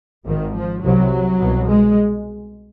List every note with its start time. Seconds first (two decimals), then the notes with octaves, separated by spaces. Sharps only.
0.26 G#1 G#2 D#3
0.55 F3
0.83 C2 C3 F#3
1.39 C2 B2
1.68 G#3